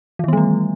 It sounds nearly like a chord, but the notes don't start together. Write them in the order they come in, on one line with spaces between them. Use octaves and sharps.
E3 D#3 B3 G3 A3